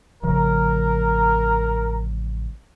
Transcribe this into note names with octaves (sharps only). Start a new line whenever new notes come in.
A1 C#3 F3 A#4